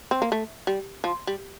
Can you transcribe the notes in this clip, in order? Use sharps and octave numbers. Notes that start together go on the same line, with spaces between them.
C4
A#3
A3
G3
F3
G3